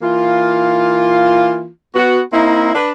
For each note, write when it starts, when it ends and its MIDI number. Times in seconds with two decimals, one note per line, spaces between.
0.02 1.68 52
0.02 1.68 58
0.02 1.68 65
1.95 2.20 59
1.95 2.20 66
2.33 2.72 58
2.33 2.72 60
2.33 2.72 63
2.33 2.72 64
2.74 2.92 62
2.74 2.92 71